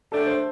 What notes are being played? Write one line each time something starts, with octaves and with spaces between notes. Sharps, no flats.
D3 A3 D4 G4 A4
C5